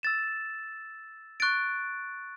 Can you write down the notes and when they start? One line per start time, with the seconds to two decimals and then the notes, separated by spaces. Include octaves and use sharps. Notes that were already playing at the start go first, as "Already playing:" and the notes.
0.03 E6 A6 E7
1.40 C#6 F#6 A6 D7